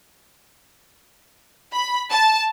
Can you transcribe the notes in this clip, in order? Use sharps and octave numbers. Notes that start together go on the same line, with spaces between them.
B5
A5